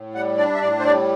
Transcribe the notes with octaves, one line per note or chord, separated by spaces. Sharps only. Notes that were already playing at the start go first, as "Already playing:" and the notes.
Already playing: A2
G3 F#5
D4 D5
E5
A2 D5
C5
G3 D5